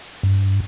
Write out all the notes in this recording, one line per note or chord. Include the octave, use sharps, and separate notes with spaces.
G2